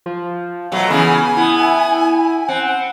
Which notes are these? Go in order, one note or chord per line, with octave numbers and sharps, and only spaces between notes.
F3
B2 F#3 A3
C#3 E3 B3 G#5
B3 E4
C4 F#5